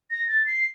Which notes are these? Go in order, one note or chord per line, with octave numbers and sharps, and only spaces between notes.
A#6
A6
C7